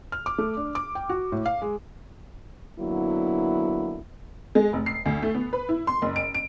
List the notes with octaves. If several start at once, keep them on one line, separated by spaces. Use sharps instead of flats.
F6
D6
A3
D4
D6
G5
F#4
A2
F5
G#3
D3 F#3 A#3 B3 E4
G#3
F1
C7
D2
A3
B3
B4
E4
C6
F#1
D7
D7